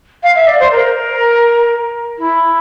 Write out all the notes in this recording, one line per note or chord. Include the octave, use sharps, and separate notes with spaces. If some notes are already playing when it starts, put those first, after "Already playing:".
F5
E5
D5
C5
A#4
E4